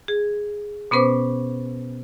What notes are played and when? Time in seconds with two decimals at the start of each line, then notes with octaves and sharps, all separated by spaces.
0.08 G#4
0.91 B2 B3 C#4 B4 C5 D6